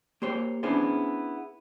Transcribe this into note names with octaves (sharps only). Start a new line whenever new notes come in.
A#3 G4 C5 C#5
B3 C#4 D4 E4 G#4 C5